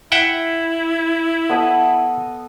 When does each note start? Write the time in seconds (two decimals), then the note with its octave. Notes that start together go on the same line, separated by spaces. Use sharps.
0.12 E4 E5 F#5 G5
1.49 B3 A4 D#5